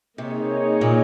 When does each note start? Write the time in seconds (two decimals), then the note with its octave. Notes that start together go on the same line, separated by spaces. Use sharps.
0.18 C3 A#3 D#4 G#4 C#5
0.81 A#2